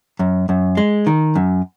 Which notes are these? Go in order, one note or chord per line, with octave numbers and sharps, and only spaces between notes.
F#2
F#2
G#3
D#3
F#2